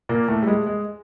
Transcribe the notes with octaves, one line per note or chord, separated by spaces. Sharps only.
A#2 A#3
A2 A3
G3
G#3
G#3